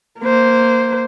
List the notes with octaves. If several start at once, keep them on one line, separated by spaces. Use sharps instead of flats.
A#3 C5